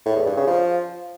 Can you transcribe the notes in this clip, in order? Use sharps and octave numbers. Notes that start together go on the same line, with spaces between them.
A2
E2
G2
C#3
F3